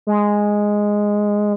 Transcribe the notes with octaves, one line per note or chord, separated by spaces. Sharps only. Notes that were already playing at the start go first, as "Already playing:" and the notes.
G#3